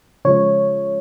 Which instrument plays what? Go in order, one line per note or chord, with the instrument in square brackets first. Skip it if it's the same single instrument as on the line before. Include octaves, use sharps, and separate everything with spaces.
[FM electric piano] C#3 F3 G#3 C#5